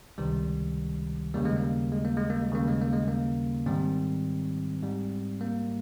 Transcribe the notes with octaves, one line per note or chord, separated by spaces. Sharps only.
C#2 C3 D#3 G3
D#2 C#3 G3 A#3
G#3
A#3
G#3
A#3
G#3
A#3
G#3
D#2 C#3 G3 A#3
G#3
A#3
G#3
A#3
G#2 D#3 G3 C4
G#2 G3
A#3